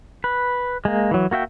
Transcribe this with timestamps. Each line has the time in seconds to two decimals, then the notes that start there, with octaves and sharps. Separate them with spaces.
0.24 B4
0.85 G#3 A#3
1.11 E3 F#3
1.31 A#3 F#4 E5 G5